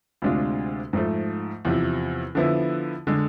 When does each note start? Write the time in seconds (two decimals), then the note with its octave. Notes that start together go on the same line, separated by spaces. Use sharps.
0.22 D2 C3 G#3 D4 F4
0.93 G#2 F3 A3
1.65 E2 C3 F3
2.35 D3 F3 B3 E4
3.07 D3 G#3